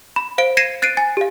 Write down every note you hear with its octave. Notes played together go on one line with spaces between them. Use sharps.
B5
C5 F5 D7
G#6 A#6 C7 C#7 D#7 E7
F#6 A6 C7 D7 D#7
G#5 A6
G4 F5